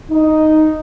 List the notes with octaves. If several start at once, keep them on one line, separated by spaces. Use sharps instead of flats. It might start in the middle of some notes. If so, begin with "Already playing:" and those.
D#4